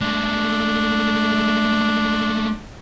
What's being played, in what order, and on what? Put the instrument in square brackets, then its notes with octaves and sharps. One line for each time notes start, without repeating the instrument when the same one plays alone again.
[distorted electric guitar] G#3 A3 [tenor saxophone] D4